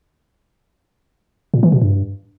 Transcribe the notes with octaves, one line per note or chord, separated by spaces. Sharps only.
A#2
E3
B2
G2